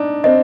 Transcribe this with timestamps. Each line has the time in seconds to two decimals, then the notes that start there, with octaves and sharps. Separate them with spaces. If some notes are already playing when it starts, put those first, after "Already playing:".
Already playing: D4 D#4
0.24 C4 D#5